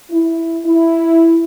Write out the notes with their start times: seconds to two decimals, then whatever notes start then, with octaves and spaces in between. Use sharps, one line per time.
0.11 E4
0.66 E4